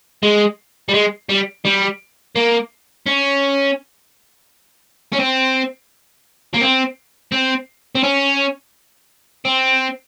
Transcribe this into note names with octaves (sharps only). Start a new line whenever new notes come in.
G#3
G3
G#3
G3
G3
A#3
C#4
C#4
C4
A#3
C4
C4
C4
C#4
C4